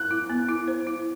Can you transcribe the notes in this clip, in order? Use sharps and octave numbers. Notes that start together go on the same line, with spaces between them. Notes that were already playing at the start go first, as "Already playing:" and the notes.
Already playing: F#6
E4
B3
E4
C5
E4